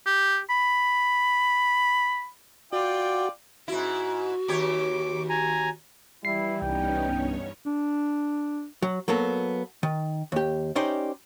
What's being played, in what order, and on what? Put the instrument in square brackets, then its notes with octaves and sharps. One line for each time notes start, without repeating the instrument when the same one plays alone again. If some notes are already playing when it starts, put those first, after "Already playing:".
[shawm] G4
B5
[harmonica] F4 D5 G5 [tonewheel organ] F#4
[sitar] G#2 E4 [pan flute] F#4
[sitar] D#2 G4 C#5 [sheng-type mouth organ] D6
[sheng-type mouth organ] G#5 A#5
[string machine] E3 [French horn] G3 [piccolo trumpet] E4 [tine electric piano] C7
[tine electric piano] C2 [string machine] B3 C#4 D#4 [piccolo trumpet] G5
[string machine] G2 C#5
[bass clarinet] D4
[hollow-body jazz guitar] F#3
F#3 A#3 B3 A4
D#3
D#2 G4
C#4 D#4 G4 C5 D5